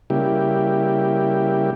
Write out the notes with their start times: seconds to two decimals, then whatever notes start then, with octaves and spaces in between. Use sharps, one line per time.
0.10 C#3 G3 A#3 E4 G4